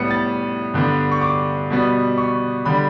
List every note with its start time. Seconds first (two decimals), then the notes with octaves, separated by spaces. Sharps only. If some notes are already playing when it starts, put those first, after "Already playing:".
Already playing: A2 G3 B3 C#7
0.11 A6
0.74 G2 D3 G3 B3
1.12 C#6
1.22 D6
1.70 B2 G3 B3
2.18 C#6
2.65 D3 G3 B5